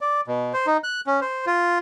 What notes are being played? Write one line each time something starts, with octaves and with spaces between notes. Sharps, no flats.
D5
B2
C5
D#4
F#6
C#4
C5
F4